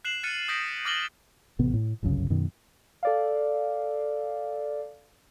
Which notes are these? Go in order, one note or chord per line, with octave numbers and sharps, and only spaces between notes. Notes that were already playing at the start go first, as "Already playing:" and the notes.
F#6 C7 E7 F#7
F6 F#6 A6 C#7 D#7
D#6 G6 A#6 B6 D7
D6 F6 A6 A#6 F#7 G7
A1 C3 B3
A2
G1 C2 F#2 C#3
F#2 B2 D#3
A4 D5 F5